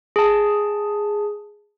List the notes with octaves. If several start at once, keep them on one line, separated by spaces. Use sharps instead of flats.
G#4 A5